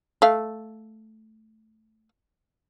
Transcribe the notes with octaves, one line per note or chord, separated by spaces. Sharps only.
A3 F5